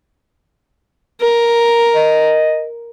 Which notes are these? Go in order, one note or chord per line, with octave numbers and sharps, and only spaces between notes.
A#4
D#5